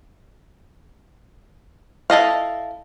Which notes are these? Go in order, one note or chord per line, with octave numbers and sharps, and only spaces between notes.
E4 A4 D#5 F5